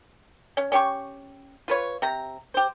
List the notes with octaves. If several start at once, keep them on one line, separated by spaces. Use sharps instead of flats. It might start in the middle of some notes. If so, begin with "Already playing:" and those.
C#4
C#4 G4 C#6
F4 B4 C#5
C3 A#5
G4 C5